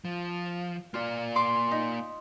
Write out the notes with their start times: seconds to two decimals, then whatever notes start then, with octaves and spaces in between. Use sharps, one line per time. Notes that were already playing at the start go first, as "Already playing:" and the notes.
0.05 F3
0.94 A#3 F4 D5
1.36 C6 D6
1.71 D#4